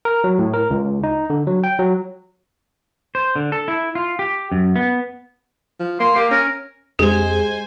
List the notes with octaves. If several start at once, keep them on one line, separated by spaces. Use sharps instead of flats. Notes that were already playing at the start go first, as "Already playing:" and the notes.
A#4
F#3
A2
A#4
C#2
D#4
D3
F#3
G5
F#3
C5
D3
A4
E4
F4
G4
F#2
B3
F3
A#3 C6
A#3 G4
C#4 A#4
F2 G#3 G4 C5 G#5